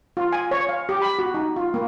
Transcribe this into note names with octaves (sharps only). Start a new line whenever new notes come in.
F4
G#5
C#5
F5
G4
B5
F#4
D#4
F4
A#3